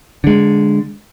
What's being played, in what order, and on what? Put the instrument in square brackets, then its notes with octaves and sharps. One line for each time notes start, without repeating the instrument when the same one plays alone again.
[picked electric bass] D3 G#3